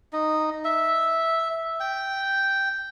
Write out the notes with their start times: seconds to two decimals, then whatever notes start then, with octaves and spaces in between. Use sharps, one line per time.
0.13 D#4
0.65 E5
1.80 G5